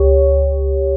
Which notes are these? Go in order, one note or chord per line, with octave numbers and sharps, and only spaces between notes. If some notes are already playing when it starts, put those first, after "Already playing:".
Already playing: C#2 G4 C#5